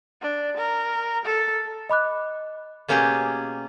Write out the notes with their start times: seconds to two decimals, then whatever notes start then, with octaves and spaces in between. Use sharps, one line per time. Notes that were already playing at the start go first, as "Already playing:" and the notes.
0.22 D4
0.57 A#4
1.25 A4
1.89 D#5 B5 D6 F#6
2.88 B2 A#3 C#4 G4 G#4